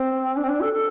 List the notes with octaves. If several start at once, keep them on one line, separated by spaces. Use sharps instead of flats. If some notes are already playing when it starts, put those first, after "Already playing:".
Already playing: C4
D4
C4
D4
A4
A4